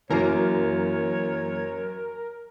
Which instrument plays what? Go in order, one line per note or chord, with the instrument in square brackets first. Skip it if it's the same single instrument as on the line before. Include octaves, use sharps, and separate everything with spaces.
[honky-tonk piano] F#2 [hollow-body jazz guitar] E3 A#3 [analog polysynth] A#4 [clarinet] C#5